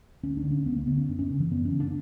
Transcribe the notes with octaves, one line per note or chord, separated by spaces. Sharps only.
D2 C#4
D4
D3
C#4
D2 B3
A#3
D3 B3
C#4
F#2 D4
C#4
C#3
E3
F#2 B3
C#4
C#3
D4